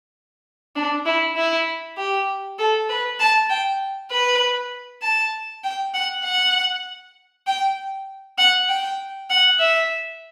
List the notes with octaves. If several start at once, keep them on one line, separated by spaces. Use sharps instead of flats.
D4
E4
E4
G4
A4
B4
A5
G5
B4
A5
G5
F#5
F#5
G5
F#5
G5
F#5
E5